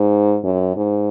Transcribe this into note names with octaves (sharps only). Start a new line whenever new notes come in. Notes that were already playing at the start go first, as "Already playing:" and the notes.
Already playing: G#2
F#2
G#2